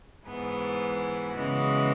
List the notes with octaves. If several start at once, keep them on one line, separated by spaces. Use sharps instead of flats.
G#2 E3 B3 E4 G#4
C#3 E3 G#3 B3 F#4